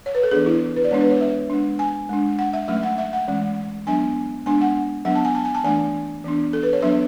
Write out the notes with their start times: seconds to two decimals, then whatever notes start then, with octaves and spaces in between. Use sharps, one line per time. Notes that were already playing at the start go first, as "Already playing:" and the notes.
0.06 C#5
0.15 B4
0.23 A4
0.31 E3 B3 D4 G#4
0.46 E4
0.76 B4
0.84 D5
0.91 G#3 B3 D4 C#5
1.01 B4
1.11 C#5
1.21 E5
1.50 G#3 D4
1.79 G#5
2.09 G#3 D4
2.39 F#5
2.53 E5
2.68 F#3 A3 C#4 E5
2.83 F#5
2.98 E5
3.13 F#5
3.28 E3 G#3 C#4
3.87 F#3 B3 D4 G#5
4.46 G#3 B3 D4 G#5
4.61 F#5
5.05 F#3 B3 D4 F#5
5.15 A5
5.25 G#5
5.35 A5
5.45 G#5
5.54 A5
5.64 E3 A3 D4 G#5
6.24 E3 B3 D4
6.53 A4
6.63 B4
6.73 C#5
6.82 F#3 B3 D4 E5